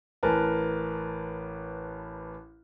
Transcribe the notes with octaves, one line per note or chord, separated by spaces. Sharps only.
A1 A#4 B4 G#5 A5